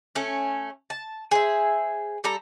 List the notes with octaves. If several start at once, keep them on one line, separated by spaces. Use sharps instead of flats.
A3 C#4
A5
G#4 C5 E5
G3 A4 A#5